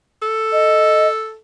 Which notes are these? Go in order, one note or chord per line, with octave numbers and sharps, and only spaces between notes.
A4
D#5